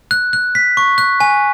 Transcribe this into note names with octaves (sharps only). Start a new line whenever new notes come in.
F#6
F#6
B6
C#6
F#6
G#5